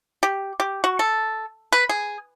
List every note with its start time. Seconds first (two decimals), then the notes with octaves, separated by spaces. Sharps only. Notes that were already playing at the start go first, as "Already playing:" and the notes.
0.23 G4
0.60 G4
0.84 F#4
0.99 A4
1.72 B4
1.89 G#4